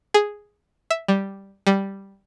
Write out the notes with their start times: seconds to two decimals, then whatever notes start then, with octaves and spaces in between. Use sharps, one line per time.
0.14 G#4
0.91 E5
1.08 G3
1.67 G3